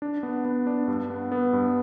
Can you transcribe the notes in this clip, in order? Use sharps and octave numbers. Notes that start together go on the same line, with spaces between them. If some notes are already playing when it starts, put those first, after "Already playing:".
D4
B3
B3
D4
G2
B3
B3
G2